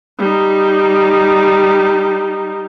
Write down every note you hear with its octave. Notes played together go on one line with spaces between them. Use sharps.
G3 D#4